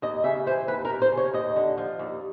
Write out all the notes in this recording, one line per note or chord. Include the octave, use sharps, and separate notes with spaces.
D#2 D#5
C#3 E5
E3 C5
D#2 B4
A#4
D#2
C5
C#3
C#5
D#2 D#5
D3
F3
D#2